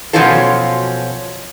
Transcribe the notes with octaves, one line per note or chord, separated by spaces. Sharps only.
B2 F3 F#3 C#4 F4 A4